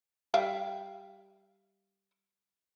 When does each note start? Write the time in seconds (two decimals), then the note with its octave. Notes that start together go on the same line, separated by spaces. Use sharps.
0.34 G3 E5 F5